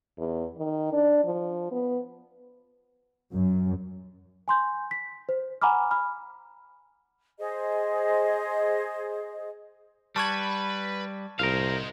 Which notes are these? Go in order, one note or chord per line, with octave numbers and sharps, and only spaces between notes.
E2
D#3
D4
F3
B3
F#2
G#5 C6 G6
B6
C5
F#5 G#5 A#5 B5 D6 F6
B5 F6
G#4 C5 D#5
G3 B4 A5 B5 C#6 G#6
C2 D#4 A#4 C5 F5